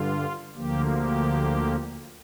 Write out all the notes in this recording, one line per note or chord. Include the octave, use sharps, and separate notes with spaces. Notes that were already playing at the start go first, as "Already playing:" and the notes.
Already playing: G2 D3 F4
D2 D3 F3 A#3 G4
G4